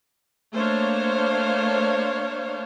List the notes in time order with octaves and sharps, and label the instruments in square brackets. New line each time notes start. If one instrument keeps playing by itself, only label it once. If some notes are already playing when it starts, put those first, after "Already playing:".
[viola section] A3 A#3 D4 C5 C#5 F5